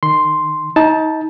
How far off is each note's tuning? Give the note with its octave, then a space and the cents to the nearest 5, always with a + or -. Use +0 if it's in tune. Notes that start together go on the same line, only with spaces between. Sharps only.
D#3 -20 C6 +0
D#4 +30 A5 +0